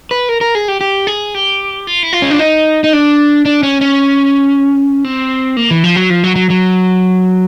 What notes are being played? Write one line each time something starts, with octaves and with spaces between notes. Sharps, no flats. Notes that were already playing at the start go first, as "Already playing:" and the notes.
B4
A#4
A#4
G#4
G4
G4
G#4
G4
F4
E4
F4
C#4
D4
D#4
D#4
D4
D4
C#4
C#4
C4
A#3
E3
F3
F#3
F3
F#3
F#3
F#3